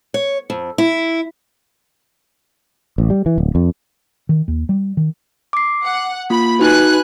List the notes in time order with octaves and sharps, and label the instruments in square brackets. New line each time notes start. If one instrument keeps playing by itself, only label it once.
[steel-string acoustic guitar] C#5
F2
E4
[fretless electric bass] A1
G3
E3
D1
F2
D#3
D#2
G3
D#3
[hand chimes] D6 C7
[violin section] F#5
[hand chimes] A#3 F4 [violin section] B5
[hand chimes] D#4 F#4 [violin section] B4 G#5 F#6